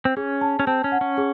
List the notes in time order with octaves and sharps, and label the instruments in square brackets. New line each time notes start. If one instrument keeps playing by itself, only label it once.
[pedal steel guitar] C4
[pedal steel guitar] C#4 [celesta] G#4
[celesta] A5
[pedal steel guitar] C#4
[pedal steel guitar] C4 [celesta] A5
[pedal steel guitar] C#4
[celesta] F#5
[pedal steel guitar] C#4
[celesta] G#4